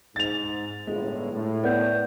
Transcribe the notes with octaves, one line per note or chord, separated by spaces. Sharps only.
G#2 A6 F7
G1 A2 G#3
A2
B3 D5 F#5 G6